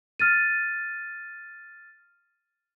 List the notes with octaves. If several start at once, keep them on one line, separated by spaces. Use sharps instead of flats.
F6 A6 D#7